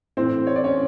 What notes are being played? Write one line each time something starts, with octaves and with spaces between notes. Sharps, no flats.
A2 E3 A3 C4 C5
C#5
D5
C#4 C#5